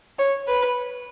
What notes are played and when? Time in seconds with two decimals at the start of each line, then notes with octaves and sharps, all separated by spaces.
0.19 C#5
0.48 B4